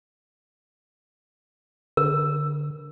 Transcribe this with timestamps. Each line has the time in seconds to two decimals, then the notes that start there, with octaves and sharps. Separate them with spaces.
1.97 D3 A#4